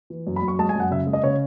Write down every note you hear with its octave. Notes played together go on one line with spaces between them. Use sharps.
E3
F#2
B5
F#2
C#6
G#3 A5
G#5
F#2 F#5
C#3 E5
G#3
D#5
C#3 C#5